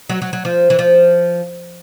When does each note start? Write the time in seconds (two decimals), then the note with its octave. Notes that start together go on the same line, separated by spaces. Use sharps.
0.09 F#3
0.22 F#3
0.33 F#3
0.45 F3
0.70 E3
0.79 F3